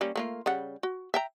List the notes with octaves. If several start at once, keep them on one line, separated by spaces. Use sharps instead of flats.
G3 A#3 C#4
A3 A#3 F4
C#3 G3 F#5
F#4
E5 G5 A#5